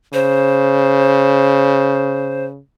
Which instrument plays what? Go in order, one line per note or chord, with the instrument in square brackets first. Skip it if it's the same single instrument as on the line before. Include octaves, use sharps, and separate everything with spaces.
[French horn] C#3 [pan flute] C5